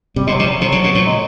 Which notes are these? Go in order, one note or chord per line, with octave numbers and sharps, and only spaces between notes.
C3 G3
B2 G#3
F#3
C3 G3
F#3
C3 F3
C#3 F#3
A#2
A2
G#3